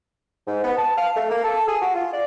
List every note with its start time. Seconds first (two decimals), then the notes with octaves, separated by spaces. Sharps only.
0.46 G#2
0.62 B3
0.76 A5
0.97 F5
1.15 A3
1.29 A#3
1.43 A4
1.68 G#4
1.81 F#4
1.94 F4
2.12 D5